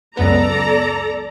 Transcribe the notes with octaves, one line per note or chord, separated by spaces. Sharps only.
C#2 F#2 B3 A4 D5 A#5